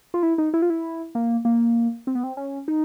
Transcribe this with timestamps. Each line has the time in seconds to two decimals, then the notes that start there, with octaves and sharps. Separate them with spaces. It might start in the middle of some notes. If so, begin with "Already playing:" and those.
0.14 F4
0.23 E4
0.38 D#4
0.54 E4
0.62 F4
0.70 E4
1.15 A#3
1.45 A#3
2.07 C4
2.15 B3
2.23 C4
2.37 C#4
2.68 D#4